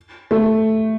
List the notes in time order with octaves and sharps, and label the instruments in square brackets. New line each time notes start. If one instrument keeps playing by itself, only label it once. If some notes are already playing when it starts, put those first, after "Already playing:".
[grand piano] A3